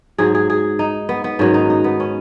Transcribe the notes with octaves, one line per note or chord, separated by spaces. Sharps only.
G#2 F#3 G#4
G#4
G#4
D#4
B3
B3
G#2 D#3 F#3 C#4
D#4
D#4
B3
C#4